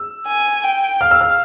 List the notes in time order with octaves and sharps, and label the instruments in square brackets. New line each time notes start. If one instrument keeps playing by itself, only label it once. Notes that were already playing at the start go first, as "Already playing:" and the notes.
Already playing: [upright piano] E6
[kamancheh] G#5
G5
[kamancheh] F5 [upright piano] F6
[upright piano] E6
F6